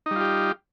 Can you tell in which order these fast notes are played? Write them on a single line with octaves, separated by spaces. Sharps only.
D#4 G3 F4 G4